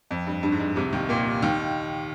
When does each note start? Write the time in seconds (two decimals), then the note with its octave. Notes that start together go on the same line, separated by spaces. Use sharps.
0.11 F2
0.27 G2
0.43 G2
0.52 G#2
0.60 G2
0.76 C2 C3
0.93 D#2 D#3
1.09 A#2 A#3
1.42 D#2 D#3